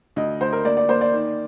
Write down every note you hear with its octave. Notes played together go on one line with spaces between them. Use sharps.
D2 D#5
D2 C5
A#4
A#3 D5
D5
A#3 C5
D5
D#3